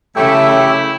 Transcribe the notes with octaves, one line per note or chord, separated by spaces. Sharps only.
C#3 E3 F#3 A3 E4 G4 E5 G5